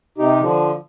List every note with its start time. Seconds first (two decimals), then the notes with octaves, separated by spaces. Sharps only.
0.18 C3 D#4 G4
0.40 D3 F3